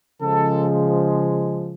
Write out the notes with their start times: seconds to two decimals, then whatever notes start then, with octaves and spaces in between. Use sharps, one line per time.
0.21 C#3 F3 G#3 A4